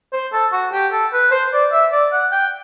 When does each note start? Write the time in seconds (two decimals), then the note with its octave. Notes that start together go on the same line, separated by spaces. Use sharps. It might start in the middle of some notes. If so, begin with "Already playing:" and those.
0.13 C5
0.32 A4
0.52 F#4
0.73 G4
0.92 A4
1.13 B4
1.32 C5
1.53 D5
1.72 E5
1.92 D5
2.12 F#5
2.32 G5